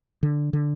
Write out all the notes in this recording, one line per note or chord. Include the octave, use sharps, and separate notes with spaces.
D3
D3